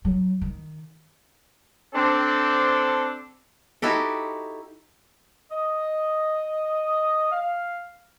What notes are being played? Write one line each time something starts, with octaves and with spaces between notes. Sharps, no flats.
F#3
D#3
C4 D4 A4
D#4 E4 F#4 G4 A4
D#5
F5